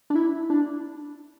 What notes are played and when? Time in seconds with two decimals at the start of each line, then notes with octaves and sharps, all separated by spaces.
0.10 D4
0.16 E4
0.50 D4